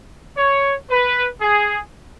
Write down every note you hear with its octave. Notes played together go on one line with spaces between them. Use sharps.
C#5
B4
G#4